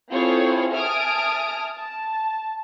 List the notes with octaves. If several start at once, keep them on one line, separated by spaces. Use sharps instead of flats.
C4 E4 F4 G#4 A4 C#5
E5 G#5 A5 D#6 F6 D7
A5